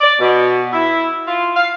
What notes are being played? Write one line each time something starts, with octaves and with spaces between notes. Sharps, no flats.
D5
B2
E4
F4
F5